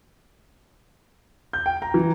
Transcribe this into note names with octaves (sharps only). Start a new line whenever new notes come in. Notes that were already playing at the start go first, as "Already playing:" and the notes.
G6
G5
A#5
E3